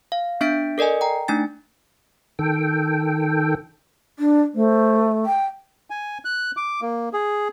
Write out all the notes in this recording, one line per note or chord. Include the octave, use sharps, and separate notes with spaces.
F5
B3 D4 E5 G6 B6 D7
A4 A#4 D5 D#5 G#5
G5 A#5
A3 D4 D#4 G#5 A6
D#3 A4 G5
D4
A3 C5
G5
G#5
F#6
D6
A#3
G#4